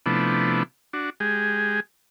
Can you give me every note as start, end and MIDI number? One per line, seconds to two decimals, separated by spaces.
0.06 0.63 48
0.06 0.63 53
0.06 0.63 57
0.06 0.63 59
0.06 0.63 62
0.06 0.63 64
0.93 1.10 62
0.93 1.10 66
1.20 1.80 56
1.20 1.80 67
1.20 1.80 68